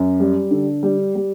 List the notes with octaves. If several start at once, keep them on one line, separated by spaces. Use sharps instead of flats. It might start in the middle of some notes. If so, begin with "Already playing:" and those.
Already playing: F#2
G3
D3
G3
G3